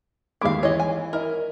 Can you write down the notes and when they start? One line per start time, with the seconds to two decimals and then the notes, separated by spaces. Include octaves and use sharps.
0.41 D#2 G#3 E4 F5 D6
0.63 E3 C#5 D#5
0.80 G#5
1.13 E4 A#4 D#5